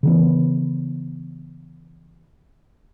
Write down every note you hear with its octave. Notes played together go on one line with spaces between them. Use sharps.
C#3 E3 B3